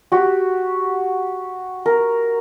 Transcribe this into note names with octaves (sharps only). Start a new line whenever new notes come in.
F#4 G4
A#4